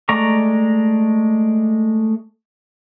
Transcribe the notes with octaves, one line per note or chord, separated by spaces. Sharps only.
G#3 A3 D5 A#5 C#6